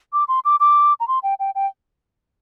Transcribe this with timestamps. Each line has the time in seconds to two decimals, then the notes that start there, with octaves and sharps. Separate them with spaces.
0.13 D6
0.28 C6
0.45 D6
0.60 D6
1.00 A#5
1.08 C6
1.23 G5
1.40 G5
1.55 G5